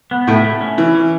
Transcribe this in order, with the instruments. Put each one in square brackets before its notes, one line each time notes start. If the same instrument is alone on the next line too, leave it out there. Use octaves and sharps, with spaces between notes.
[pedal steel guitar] B3
[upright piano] A2 A3 [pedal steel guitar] E4
[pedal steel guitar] A3
C#4
[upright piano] E3 [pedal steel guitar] C#4
[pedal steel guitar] C#4